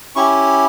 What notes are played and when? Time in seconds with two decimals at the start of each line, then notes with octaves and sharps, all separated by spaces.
0.16 C#4 E4 G4 C#6